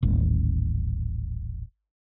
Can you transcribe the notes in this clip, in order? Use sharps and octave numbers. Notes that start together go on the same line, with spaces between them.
D#1 A1